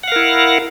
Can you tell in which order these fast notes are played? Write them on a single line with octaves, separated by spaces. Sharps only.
F#5 F5 A#4 E4